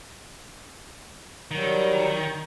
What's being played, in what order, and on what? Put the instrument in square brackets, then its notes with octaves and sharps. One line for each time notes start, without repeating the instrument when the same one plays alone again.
[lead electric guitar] D#3 [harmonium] F#3 G3